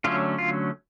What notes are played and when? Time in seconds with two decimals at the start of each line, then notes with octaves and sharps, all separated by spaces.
0.04 D3 F#3 A3 C#4 F4
0.38 F4